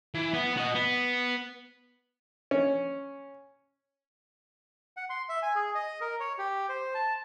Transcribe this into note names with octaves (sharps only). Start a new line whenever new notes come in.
E3
B3
F#4 D#5
B3
C#4
F#5
C6
E5
G#5
G#4
D#5
A#4
C#5
G4
C5
A5